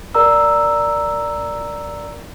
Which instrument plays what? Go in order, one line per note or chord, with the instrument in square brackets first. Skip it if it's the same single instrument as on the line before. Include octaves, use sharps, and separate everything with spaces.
[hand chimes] A#4 D5 A#5 E6